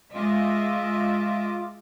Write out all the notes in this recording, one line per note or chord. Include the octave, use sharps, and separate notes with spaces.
G#3 F4 D#5 E5 D6